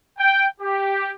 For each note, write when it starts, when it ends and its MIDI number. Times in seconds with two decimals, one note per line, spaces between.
0.18 0.44 79
0.61 1.11 67